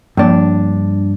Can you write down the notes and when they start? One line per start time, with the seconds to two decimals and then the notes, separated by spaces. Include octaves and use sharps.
0.17 G2 F3 A#3 D4